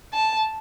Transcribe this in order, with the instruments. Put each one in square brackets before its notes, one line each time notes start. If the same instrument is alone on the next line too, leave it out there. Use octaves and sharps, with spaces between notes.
[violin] A5